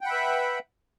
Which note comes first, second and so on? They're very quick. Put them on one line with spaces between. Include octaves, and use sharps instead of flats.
G5 F#5 B5 E5 B4